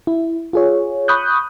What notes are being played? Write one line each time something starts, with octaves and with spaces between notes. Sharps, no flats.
E4
F4 G#4 C#5
B5 C#6 D#6 F#6 G6